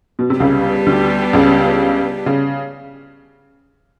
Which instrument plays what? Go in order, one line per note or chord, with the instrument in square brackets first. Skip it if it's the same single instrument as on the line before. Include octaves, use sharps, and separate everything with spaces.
[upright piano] B2
C3
[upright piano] C#2 C#3 [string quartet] G3 B3 D4 G4
[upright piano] D2 D3
C#2 C#3
C#3